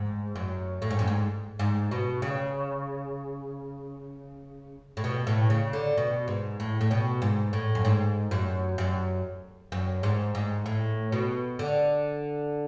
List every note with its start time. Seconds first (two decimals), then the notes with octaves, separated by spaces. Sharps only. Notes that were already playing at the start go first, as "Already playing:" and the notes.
Already playing: G#2
0.35 F#2
0.82 A2
0.90 G#2
0.99 F#2
1.08 G#2
1.59 G#2
1.91 B2
2.22 C#3
4.97 A2
5.04 B2
5.27 A2
5.50 C#3
5.73 D3
5.97 B2
6.28 G#2
6.60 A2
6.81 A2
6.91 B2
7.22 G#2
7.53 A2
7.75 F#2
7.85 G#2
8.31 F#2
8.78 F#2
9.72 F#2
10.03 G#2
10.35 G#2
10.66 A2
11.12 B2
11.59 D3